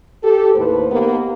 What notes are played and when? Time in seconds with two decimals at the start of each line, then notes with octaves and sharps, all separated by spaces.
0.22 G4 A4
0.55 D#2 A2 B4 C5
0.90 A#3 B3 D#4 G4 A#4